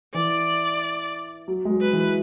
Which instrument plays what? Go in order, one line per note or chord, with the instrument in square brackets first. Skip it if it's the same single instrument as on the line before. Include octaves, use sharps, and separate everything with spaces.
[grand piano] E3 [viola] D5
[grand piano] F#3
G#3
F#3
[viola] B4
[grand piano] E3